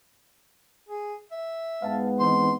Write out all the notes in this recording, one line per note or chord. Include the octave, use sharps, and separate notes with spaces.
G#4
E5
G#2 G#3 B3 F5 A5
E3 C4 D#4 C6